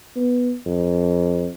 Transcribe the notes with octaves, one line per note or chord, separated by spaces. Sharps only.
B3
F2